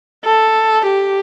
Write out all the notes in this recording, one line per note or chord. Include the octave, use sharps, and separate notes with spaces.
A4
G4